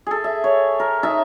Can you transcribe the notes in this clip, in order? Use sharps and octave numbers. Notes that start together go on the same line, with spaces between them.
G#4 A4
E5
C#5
A#4
D#4 E5 A5